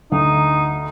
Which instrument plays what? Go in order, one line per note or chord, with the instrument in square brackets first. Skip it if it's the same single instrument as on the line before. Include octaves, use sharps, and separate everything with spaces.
[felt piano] D2 [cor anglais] D#4